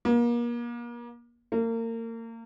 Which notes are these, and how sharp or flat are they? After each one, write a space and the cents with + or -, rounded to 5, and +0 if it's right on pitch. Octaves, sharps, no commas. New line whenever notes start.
A#3 +35
A#3 -35